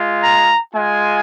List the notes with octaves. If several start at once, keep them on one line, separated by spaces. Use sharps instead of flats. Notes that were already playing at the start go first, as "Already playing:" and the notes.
Already playing: G#3 F4
A#5
G#3 F4 G#5